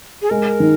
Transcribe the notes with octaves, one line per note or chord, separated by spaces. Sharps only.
G#4
G#3 A#4
D#3